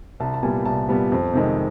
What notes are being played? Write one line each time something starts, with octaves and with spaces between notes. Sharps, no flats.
C2 A5
A5
A#2 G3 B3 G#5
C2 A5
A#2 G3 B3
F2
C3 D#3 G#3